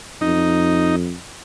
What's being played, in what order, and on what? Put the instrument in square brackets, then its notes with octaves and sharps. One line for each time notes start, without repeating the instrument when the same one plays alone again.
[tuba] F2 [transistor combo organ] D#4